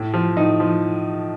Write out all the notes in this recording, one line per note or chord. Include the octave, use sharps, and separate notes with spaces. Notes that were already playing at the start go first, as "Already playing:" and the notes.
Already playing: A2
F3
A2 D#4
F3